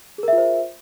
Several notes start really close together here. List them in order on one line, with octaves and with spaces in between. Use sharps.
G#4 A#4 E5 F4 C5